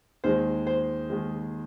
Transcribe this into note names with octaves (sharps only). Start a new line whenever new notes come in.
D#2 D#3 G#3 C5
C5
D#2 D#3 G#3